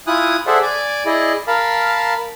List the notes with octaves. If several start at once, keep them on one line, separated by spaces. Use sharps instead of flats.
E4 F4 G#5 D#6 F#6
G#4 A4 C5 D5 E5 F#5
D5 G#5 D6
E4 G#4 D5 D#5
A#4 F5 A5 B5